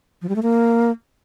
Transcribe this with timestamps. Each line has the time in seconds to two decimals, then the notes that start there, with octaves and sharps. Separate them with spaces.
0.22 F3
0.29 G3
0.36 A3
0.43 A#3